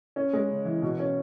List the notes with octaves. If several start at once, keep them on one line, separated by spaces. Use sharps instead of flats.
C#4
G#3
C#3
E3
B2
C#4